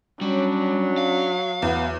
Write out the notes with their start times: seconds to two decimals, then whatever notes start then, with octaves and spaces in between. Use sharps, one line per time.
0.21 F#3 G3 C#4 D4
0.98 F5
1.62 E2 B3